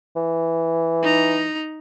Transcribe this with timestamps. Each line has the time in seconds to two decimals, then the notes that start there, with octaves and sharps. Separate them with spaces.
0.16 E3
1.02 D#4 A#5